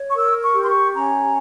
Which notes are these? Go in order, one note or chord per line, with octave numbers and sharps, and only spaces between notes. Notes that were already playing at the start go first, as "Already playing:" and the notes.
Already playing: C#5
C#6
A#4 E6
C#6
G4
C6
C#6
C#4 A#5